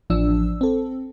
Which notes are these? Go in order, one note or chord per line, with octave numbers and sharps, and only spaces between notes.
A1 F3 D4 E6
C4 A4